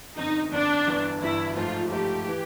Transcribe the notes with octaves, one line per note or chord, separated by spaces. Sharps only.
G1 F2 D3 D#4
G1 F2 D3 D4
G1 G2 E3
G1 G2 E3 E4
G#2 F3 A3 F4
G#2 F3 A3 G4
E3